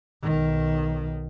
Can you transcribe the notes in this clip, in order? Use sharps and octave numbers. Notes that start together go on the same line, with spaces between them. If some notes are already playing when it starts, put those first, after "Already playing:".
B1 D#3